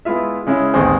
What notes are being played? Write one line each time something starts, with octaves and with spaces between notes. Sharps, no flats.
G#3 B3 E4 F4 E5
C#3 G#3 C#4 E4
A1 D#2 G#3 C4 C5 G#5